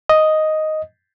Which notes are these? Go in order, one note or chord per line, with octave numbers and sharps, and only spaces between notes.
D#5